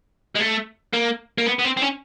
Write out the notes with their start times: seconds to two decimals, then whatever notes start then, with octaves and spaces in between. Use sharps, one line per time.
0.36 G#3
0.41 A3
0.94 A#3
1.38 A#3
1.46 B3
1.59 B3
1.64 C4
1.77 C4
1.82 C#4